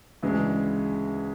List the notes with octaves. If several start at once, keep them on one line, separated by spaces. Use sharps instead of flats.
D2 C#3 E3 G#3